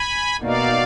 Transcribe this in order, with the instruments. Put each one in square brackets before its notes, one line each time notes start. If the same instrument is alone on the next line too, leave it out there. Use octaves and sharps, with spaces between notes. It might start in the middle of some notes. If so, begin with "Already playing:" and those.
Already playing: [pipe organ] G#5 B5
[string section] B2 A#3 D#4 F#4 [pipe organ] D5 F5